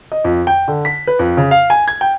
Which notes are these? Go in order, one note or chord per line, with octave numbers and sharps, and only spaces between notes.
D#5
F2
G5
D3
B6
B4
F2
C#3
F5
G#5
G#6
G5